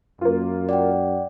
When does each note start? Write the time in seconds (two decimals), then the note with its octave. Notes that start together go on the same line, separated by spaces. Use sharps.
0.21 F#2 A#3 F4
0.69 D5 F#5 G5